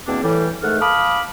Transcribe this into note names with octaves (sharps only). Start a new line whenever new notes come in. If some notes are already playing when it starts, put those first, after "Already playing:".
E2 B2 A#3 C4 D4
A2 E3 G3
G#2 D#3 A3 A4 F#5 F6
F5 A5 B5 D6 D#6 F6